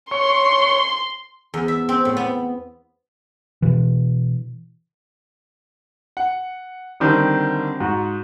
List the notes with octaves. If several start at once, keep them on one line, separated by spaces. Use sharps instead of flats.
C#5 C6
E2
E5
C4
A2
B3
B2 E3
F#5
D3 D#3 G3 C4
G#2 F#4